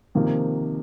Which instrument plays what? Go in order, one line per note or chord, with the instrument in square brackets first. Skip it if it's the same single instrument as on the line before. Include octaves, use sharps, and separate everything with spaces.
[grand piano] C3 F3 A#3 [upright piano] D#3